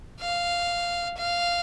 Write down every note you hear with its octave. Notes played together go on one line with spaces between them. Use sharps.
F5
F5